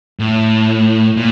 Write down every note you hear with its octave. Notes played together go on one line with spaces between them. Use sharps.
A2
A#2